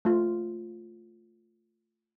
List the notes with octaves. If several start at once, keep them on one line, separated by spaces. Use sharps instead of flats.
A3 F4